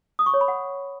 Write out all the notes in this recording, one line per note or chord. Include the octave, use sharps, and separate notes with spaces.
D#6
C#6
C#5
B5
F#5